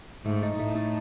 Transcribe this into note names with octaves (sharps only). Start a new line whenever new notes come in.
G#2 A3
D#4 A4
A2 A3
D#4 A4